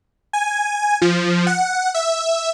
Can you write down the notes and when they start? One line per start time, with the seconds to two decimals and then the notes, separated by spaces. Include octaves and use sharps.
0.33 G#5
1.02 F3
1.47 F#5
1.94 E5